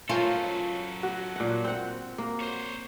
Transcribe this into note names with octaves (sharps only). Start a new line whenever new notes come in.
F#3 C#4 F4 A4 A#4 C5
F#4
A#2 F#5
C4 F#5
A#3
C5 C#5